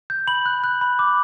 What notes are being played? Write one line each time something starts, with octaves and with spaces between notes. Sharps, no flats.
G6
B5 F#7
F#6
F#6
B5
D6